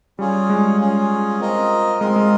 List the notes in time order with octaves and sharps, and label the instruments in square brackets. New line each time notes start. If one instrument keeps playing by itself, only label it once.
[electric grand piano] G3 [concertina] C#4 F4 G#4
[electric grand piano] G#3
[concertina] C#4 F4 G#4
C4 F4 A#4 D#5
[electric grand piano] G#3 [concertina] C4 F4 A#4 D#5
[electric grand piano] G#3